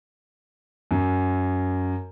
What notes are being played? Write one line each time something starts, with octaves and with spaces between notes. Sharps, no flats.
F#2